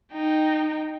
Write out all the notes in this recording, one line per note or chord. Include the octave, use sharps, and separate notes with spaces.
D#4 G5